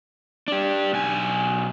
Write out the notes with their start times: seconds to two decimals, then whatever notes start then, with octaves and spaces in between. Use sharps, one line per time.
0.48 D4 G4
0.93 B1 G#5